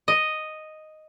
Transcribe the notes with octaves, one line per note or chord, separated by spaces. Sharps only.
D#5